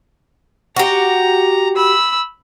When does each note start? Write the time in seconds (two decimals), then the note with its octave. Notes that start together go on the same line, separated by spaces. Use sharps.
0.76 F#4 G4 A#5
1.76 B5 E6